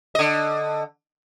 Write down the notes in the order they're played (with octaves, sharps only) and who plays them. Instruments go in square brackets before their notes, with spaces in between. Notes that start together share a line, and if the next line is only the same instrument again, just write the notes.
[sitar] D3 D#5